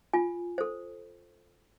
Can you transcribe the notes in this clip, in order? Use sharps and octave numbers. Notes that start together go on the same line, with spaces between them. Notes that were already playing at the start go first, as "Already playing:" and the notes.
F4 G#5
A4 C5